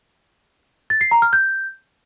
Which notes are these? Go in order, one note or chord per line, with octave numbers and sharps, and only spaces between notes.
A6
C7
A#5
F6
G6